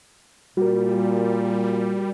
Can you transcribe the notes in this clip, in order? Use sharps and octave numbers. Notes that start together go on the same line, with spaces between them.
A#2 G3 F#4 A#4